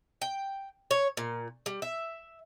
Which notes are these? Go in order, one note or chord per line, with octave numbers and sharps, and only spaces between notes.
G5
C#5
A#2
G3
E5